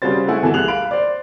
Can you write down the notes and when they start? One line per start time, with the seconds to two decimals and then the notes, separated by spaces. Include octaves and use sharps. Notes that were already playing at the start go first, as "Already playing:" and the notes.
0.02 C#3 G3 F#4 C5 A6
0.27 G#3 A3 E4 A4 F#5 G#5
0.42 B2 E3 A4 G#5 E7
0.54 C2 G#4 F#6 F7 F#7
0.68 F5 B5 D7 F#7
0.91 C5 D5